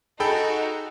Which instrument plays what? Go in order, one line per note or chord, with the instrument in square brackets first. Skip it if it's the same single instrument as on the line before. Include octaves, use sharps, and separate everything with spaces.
[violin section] D#4 F#4 [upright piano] G#4 [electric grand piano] A4 G5 B5